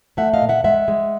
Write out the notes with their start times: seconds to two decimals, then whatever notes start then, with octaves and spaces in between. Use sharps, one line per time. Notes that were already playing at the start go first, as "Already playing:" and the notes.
0.17 A3 E5 F#5
0.33 D#5 F5
0.41 A#2
0.49 E5 F#5
0.64 G#3 E5 F#5
0.88 G#3